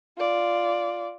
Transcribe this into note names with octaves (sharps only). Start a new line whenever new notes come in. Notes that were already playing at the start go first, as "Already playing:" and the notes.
F4 D5